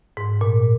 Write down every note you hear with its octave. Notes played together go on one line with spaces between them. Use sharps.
G#2
A#2